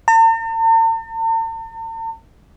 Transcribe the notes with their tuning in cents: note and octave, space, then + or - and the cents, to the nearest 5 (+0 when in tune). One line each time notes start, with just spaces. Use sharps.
A5 +45